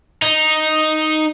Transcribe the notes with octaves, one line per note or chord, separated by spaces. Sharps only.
D#4